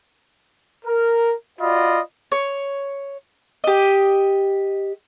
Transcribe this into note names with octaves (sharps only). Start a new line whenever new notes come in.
A#4
F4 F#4 D5 D#5 B5
C#5
G4 D#5